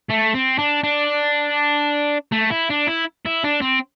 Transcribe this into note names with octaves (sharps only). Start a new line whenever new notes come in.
A3
C4
D4
D4
A3
E4
D4
E4
E4
D4
C4